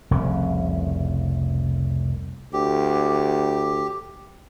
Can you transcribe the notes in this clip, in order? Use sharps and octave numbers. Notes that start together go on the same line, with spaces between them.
F1 C2 C#3
D2 G4